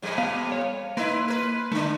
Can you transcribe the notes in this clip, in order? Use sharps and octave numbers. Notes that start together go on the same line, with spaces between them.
F2 A#2 G3
B3 F5
C#5
A#3 D#4 E4 B4 C6
A#4 B4
D3 A3 D4